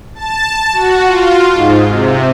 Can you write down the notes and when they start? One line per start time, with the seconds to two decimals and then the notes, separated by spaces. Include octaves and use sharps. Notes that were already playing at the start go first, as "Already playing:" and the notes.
0.15 A5
0.73 F#4
1.05 F4
1.52 G#2
1.86 C3